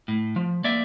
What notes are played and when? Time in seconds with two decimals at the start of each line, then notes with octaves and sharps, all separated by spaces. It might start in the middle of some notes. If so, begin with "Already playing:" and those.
0.08 A2
0.36 F3
0.64 A#3 D5 E5